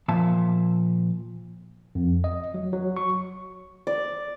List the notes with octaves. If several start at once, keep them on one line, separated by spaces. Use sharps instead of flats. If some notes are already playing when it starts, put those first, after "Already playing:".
A#2 F3 E5 A5
F2
D#5
F#3
F#3
C#6
D5